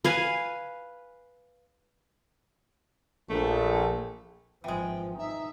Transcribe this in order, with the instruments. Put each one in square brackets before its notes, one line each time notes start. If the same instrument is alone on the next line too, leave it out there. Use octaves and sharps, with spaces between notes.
[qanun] B4 F5 G#5
[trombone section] A#1 [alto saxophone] A3
[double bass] G#1 F3 [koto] E3 G#3 [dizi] G5
[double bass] D#4 [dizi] E5